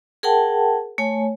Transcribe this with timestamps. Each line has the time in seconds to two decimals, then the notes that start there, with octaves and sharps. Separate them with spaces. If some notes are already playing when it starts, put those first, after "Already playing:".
0.23 G#4 A#4 F#5 G5 A5
0.98 A3 C#5 G#5